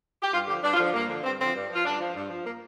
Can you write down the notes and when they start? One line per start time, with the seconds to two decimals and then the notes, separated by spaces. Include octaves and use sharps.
0.22 G4
0.33 G2 F4
0.47 D3 F3 G4
0.63 G2 D4
0.73 F4
0.79 D3 F3 D4
0.94 G2 A#3
1.08 D3 F3
1.24 G2 C4
1.39 D3 F3 C4
1.54 G2
1.70 F3 F4
1.85 G2 D4
2.00 F3
2.15 G2
2.30 F3
2.45 A#3